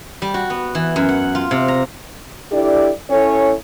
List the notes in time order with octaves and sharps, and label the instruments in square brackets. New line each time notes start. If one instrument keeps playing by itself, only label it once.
[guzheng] G3
F#4
B3
E3
F#2
F#5
F4
C3
A#5
[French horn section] D4 E4 G4 A4 D5
C#4 E4 A4 C#5